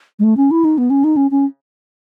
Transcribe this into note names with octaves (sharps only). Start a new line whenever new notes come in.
G#3
A3
C#4
E4
D#4
B3
C#4
D#4
C#4
C#4